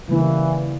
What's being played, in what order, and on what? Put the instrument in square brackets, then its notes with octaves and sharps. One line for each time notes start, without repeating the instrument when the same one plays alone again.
[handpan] C#3 G3 A#3 E4 [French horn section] E3